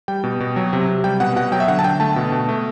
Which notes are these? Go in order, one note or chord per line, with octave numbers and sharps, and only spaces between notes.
G3 G5
B2
B2
F#3
C3
C3
G3 G5
B2 F#5
B2 F#5
F#3 G5
E5
D3 F#5
A5
D3 G5
A3 A5
B2
B2
A3